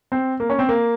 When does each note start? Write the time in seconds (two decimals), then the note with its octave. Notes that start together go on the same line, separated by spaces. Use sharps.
0.12 C4
0.40 A#3
0.50 C#4
0.59 C4
0.69 A#3